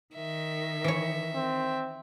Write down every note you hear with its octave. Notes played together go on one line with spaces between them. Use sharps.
D#3 E5
E3 C#5
C4